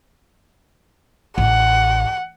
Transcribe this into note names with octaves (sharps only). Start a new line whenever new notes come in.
A1 F#5